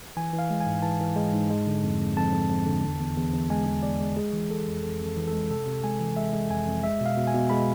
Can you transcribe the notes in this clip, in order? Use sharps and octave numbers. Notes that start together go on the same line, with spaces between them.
E3 G#5
E3
F5
G#3
G#5
G#2
E3 A5
E3
G#3
G#2
G#3
D3
F2
F2
F2 A5
F2
F2
D3
E2
E2
E2
E2
G#3 G#5
E2
E2 D5
G#3
G#3 G#4
E3
G#3 A4
F2
F2 A4
F2
A4
E3
A4
G#3
C3 A4
C3
G#3 G#5
E3
G#3 E5
G#3
F2 G#5
F2
G#3 E5
B2
F5
B2
G#5
B2
G#3 B5